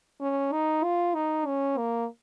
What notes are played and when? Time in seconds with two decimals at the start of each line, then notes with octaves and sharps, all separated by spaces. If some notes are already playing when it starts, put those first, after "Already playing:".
0.21 C#4
0.52 D#4
0.84 F4
1.15 D#4
1.46 C#4
1.78 A#3